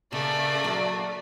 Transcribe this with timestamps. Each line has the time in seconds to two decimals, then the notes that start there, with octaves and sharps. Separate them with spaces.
0.13 C#3 A3 A#3 D5
0.64 F#3 D4